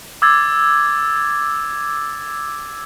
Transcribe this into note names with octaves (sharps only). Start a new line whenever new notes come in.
D6 E6 G#6 A6